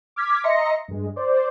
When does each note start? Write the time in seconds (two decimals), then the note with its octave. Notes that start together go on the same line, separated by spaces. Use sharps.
0.16 D6 F6 G#6 B6
0.44 D#5 E5 A#5 C6 A#6 C#7
0.88 G2 G#3
1.16 C5 D5